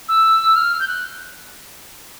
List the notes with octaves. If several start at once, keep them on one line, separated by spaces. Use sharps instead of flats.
E6
F6
G6
F#6